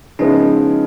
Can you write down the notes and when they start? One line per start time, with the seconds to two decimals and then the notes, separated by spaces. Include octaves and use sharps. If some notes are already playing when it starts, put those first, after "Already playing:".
0.19 C#3 F3 G#3 B3 C#4 D#4 E4